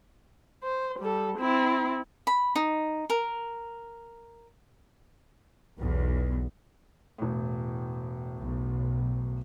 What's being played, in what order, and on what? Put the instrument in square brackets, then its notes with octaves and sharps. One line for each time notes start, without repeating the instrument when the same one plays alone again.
[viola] C5
G3 A4
C4 E4
[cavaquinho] B5
D#4
A#4
[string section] B1 E2
[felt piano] E1 A2
[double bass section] B1